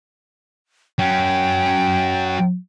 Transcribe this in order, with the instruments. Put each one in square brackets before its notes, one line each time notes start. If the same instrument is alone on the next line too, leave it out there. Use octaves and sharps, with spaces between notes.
[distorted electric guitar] F#3 C#4 [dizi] G5